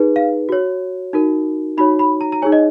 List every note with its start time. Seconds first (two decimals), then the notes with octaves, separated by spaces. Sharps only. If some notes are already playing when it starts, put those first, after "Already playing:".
Already playing: D#4 G#4 B4
0.16 F5
0.49 F#4 C#5
1.13 D#4 F#4 A#4
1.77 D#4 F#4 C#5 B5
1.99 B5
2.21 A#5
2.32 A#5
2.42 D#4 G#4 C#5 G#5
2.52 D#5